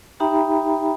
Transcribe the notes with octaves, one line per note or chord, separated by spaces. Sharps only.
D#4 G4 E5 G5 A#5 B5